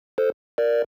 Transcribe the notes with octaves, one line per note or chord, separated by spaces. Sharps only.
A4 C5
A#4 D5